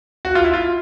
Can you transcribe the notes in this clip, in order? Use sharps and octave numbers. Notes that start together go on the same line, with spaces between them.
F#4
F4
E4
F4